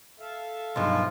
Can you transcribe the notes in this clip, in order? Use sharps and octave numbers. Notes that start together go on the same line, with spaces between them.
A4 E5 F5
B1 G2 F3 G#3 F4